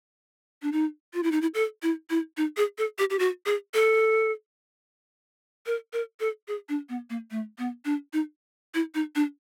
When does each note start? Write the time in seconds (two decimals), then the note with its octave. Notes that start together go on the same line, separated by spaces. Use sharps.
0.62 D4
0.72 D#4
1.14 F4
1.23 E4
1.32 D#4
1.42 E4
1.54 A4
1.83 E4
2.10 E4
2.37 D#4
2.57 G#4
2.78 A4
2.98 G4
3.10 G4
3.19 F#4
3.46 G#4
3.74 A4
5.66 A#4
5.93 A#4
6.20 A4
6.48 G#4
6.69 D4
6.89 B3
7.10 A#3
7.31 A3
7.58 B3
7.85 D4
8.13 D#4
8.74 E4
8.95 D#4
9.15 D4